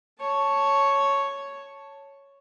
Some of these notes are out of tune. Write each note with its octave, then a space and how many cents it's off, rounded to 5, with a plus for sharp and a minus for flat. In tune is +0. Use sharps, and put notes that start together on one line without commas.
C#5 +0 A5 +0